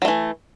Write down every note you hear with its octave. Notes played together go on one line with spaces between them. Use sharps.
E3 F#3 A3